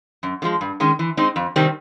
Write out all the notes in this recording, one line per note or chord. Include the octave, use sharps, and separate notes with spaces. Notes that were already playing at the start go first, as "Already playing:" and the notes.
F#2
D3 F3 G#3
G2
D#3 G#3 C#4
E3
G#3 C4 D#4
F2
C3 D#3 G3 C4